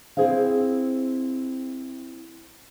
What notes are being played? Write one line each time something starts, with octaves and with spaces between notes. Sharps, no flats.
C4 E4 G#4 C5 F5